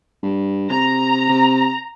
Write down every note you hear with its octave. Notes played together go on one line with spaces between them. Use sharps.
G2
C3 A#5
C3